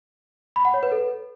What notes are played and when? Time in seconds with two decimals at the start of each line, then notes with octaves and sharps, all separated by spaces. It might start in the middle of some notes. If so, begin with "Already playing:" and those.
0.56 B5
0.65 F#5
0.74 C#5
0.83 B4
0.92 A4